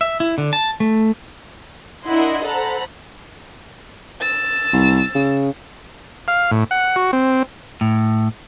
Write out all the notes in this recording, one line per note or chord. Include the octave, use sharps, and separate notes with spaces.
E5
E4
D3
A5
A3
D4 E4 A#4 D#5 F#5 C6
A4 C5 F#5 A#5 B5
E6 A6
C2
C#3
F5
A2
F#5
F#4
C4
A2